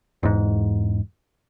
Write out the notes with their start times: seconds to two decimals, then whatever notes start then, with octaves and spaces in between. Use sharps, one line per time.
0.23 E1 G#2